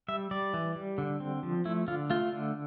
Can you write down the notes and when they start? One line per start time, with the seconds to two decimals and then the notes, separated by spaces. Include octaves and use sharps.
0.08 G3 E5
0.31 G3 D5
0.54 E3
0.76 G3
0.98 D3
1.20 C4
1.43 F3
1.65 A3 E4
1.88 D3 F4
2.10 A3 F4
2.33 D3